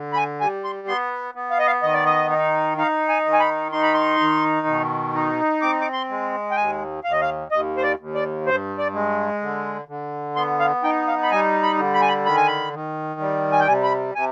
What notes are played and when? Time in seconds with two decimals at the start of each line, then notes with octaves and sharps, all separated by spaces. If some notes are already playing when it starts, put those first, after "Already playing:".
Already playing: D3
0.13 B5
0.17 G#5
0.41 G3 G#5
0.64 C6
0.87 B3 C6
1.35 B3
1.51 F5
1.59 D#5
1.67 F5
1.83 D#3 D#5
1.93 D5
2.05 D#5
2.30 D#4
2.78 D#4 F5
3.09 G#5
3.25 D#3
3.33 G#5
3.40 B5
3.72 D#4 C6
3.83 B5
3.94 C6
4.20 D#3
4.67 B2
5.14 D#4
5.62 C4 D6
5.81 D6
5.93 C6
6.09 G#3
6.51 G5
6.57 D#2 G#5
7.04 D#2 F5
7.12 D#5
7.21 F5
7.51 D#2 D#5
7.77 C5
7.83 D5
7.99 D#2
8.15 D5
8.46 G2 C5
8.78 D5
8.94 G#3
9.41 D3
9.88 D3
10.36 B3 C6
10.60 F5
10.84 D#4 G5
11.07 F5
11.23 B5
11.31 G3 G#5
11.63 B5
11.78 D3
11.94 B5
12.02 G#5
12.08 B5
12.25 D#3 B5
12.37 G#5
12.47 B5
12.73 D#3
13.20 G3
13.52 G#5
13.60 G5
13.68 C3 G#5
13.84 B5
14.15 C3 G#5